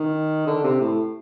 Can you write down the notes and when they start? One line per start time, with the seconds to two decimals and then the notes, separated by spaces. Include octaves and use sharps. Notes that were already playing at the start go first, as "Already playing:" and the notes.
Already playing: D#3
0.47 D3
0.64 C3
0.81 A2